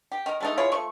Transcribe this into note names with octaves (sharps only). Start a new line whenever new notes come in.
G4
D#3 D#4 A#4
G#3 A3 D#4
E4 F4 G#4 C#5
F3 A3 C#6